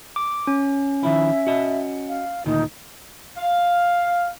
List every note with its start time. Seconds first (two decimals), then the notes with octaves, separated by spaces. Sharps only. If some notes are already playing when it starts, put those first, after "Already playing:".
0.16 D6
0.47 C#4
1.03 D#3 F3 E4 E5
1.47 F#4 D#5
2.08 F5
2.46 D2 A#2 D#3 D#4
3.37 F5